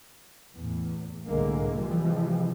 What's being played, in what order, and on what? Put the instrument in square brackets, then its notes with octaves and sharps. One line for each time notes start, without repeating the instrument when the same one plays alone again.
[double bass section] E2 A2
C2 A2 D3 G#3 A#3
C3 E3 F3 G3 G#3